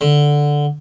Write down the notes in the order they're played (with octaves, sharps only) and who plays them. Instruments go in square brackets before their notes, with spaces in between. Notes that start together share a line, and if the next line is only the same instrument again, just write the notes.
[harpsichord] D3